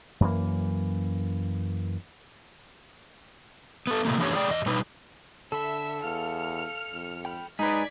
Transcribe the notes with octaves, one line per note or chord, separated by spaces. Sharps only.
F#2 E3 A#3
B3 A4
A2 C3 E3 A3 A#3
E3 A3 B3 D4 G4 C#5
G#4 D5 G5
E2 D#5
B2 G3 D#4 B4
D3 A4 E5 B5
E2 F5 F6 C#7
F2
G5 B5
G#2 D#4 G#4 B4 D5 G#6 B6